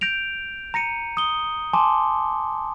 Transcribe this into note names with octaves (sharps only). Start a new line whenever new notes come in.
G6 A#6 D7 F7
A#5 A#6 C#7 D#7
D#6 G7
G#5 A5 C6 D6